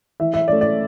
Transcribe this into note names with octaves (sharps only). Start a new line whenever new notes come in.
E3 E5
E5
A3 C#4 D5
D5